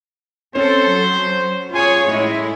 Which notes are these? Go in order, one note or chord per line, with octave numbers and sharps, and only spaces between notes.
C4 C#4 A4 C5
F#3
F4 G#4 C#5 G#5
A2 G#3 E4